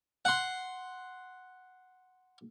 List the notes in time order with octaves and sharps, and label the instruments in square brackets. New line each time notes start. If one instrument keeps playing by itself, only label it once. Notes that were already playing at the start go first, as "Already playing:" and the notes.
[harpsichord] F#5 C6